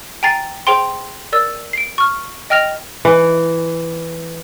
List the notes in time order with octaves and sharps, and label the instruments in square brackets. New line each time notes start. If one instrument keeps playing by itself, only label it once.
[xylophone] G5 G#5 A#5 A6 C7
G#4 C5 G5 C6
A#4 D5 E6
C7 D7
C#6 F6
D#5 G5 F6 A#6 F7
[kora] E3